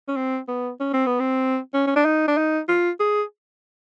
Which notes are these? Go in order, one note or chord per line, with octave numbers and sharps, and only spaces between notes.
C#4
C4
B3
C#4
C4
B3
C4
C#4
C#4
D4
D#4
D4
D#4
F4
G#4